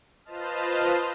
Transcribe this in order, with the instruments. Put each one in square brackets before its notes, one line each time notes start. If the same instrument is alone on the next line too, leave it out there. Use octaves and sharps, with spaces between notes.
[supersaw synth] F4 B4 C5 D#5 A5 F6